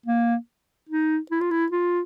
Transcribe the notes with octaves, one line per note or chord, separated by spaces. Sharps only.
A#3
D#4
E4
F4
E4
F4